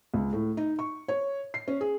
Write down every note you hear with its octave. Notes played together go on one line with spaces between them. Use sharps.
C#2
A2
D#4
C#6
C#5
C7
C#4
G#4